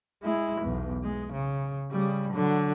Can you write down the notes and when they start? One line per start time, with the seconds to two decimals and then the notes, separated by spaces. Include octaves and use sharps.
0.23 G#3 E4
0.61 B1 E2
1.03 G#3
1.33 C#3
1.91 C#3 G3
2.32 D3 F#3